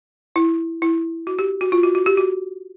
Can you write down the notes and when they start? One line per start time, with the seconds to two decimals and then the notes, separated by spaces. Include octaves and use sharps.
0.36 E4
0.82 E4
1.27 F#4
1.39 G4
1.61 F#4
1.72 F4
1.83 F#4
1.95 F#4
2.06 G4
2.17 F#4